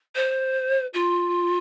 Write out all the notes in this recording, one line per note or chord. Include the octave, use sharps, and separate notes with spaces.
C5
F4